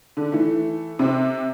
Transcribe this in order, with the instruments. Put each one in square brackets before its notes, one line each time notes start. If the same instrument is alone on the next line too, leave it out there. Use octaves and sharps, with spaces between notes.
[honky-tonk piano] D3
E3 A3
C3 C4